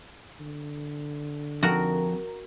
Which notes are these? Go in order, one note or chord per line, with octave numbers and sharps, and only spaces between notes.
D3
F2 F#4 A#4